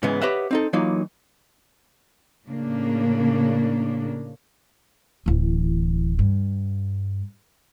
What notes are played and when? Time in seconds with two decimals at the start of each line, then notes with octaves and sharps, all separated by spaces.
0.03 G#2 C#3 E3 G#3 B3
0.22 G4 B4 C#5 D#5 E5 F#5
0.51 C4 D#4 A4
0.73 E3 F#3 A#3 D#4 F4
2.46 A2 C#3 A#3 D4
5.26 D1 E3
6.19 G2